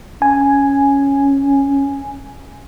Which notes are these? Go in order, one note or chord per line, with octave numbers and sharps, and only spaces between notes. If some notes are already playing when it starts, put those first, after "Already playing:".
C#4 G#5